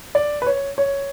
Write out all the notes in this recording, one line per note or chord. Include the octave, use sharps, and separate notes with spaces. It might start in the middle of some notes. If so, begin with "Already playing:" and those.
D5
B4
C#5
C#5